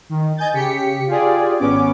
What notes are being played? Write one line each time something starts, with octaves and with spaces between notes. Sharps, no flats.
D#3
D#5 G#5 G6 A6
C#3 G4 B6 C#7
F4 G4 G#4 D5
G#1 B3 C#4 D6